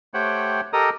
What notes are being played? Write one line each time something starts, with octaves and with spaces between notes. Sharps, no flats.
A3 G4 C5 C#5 F#5 G5
G4 A4 A#4 D#5 A#5 D#6